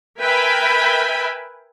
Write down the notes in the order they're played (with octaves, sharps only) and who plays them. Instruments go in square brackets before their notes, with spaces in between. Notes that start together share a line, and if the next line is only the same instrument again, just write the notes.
[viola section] A#4 B4 E5 G5 G#5 B5